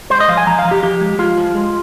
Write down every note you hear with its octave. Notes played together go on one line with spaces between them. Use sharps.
G#3 C5
D#5
F3 F5
G#5
F3 A#5
F5
F3
G4
F3 G4
G#3
G#3 F4
F3
G#3